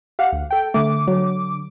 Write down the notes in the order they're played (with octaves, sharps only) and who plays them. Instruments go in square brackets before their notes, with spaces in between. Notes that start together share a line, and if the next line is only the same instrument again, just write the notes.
[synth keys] G4 F5 F#5
D2
A4 G5
[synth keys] D3 D6 [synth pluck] A3
[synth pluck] F#3